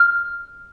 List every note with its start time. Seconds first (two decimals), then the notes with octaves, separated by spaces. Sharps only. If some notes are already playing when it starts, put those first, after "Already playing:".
Already playing: F6